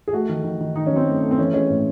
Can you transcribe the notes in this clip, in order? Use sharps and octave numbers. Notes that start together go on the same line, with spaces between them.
G#4
A3 F#4
D#3
D#3
D#3
D#3 D#4
F#3 C#4
C4
A3
A3
C4
E3 C#4
G#3 C#4
A2